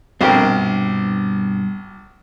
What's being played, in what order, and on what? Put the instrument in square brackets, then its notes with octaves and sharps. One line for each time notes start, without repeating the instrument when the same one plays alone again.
[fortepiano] A#1 G4 A#4 [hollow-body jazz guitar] G2 B2 C4